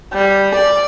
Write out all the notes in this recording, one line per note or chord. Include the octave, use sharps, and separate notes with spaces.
G3
D5